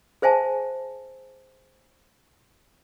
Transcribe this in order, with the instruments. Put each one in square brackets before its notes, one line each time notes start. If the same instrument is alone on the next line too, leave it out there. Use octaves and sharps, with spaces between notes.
[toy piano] G#4 C5 E5 G#5 A5